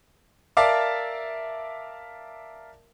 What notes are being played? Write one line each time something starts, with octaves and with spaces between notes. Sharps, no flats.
A#4 D5 E5 F5 A5 D6